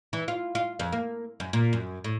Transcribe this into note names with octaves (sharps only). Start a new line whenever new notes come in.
E3
F4
F4
F2
A#3
F#2
A#2
F#2
A2